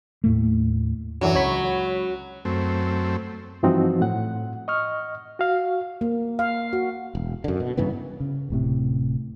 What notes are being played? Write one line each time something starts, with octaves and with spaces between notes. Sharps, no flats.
D#2 A2 A3
F#2 D3 E3 F#3
C#2 C#5 B5
F#2 A3 C4
G2 E3 F3 C4 D#4 F#4
A2 F#5
D#5 C#6 F6
F#4 F5
A#3
F5
F#4
E1
F#2 D3
B2
G2 C#3 E3 B3
C#3
D1 A2 C3